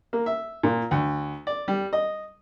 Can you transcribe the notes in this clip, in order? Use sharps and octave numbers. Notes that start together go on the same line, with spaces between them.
A#3
E5
A#2
D2
D5
G3
D#5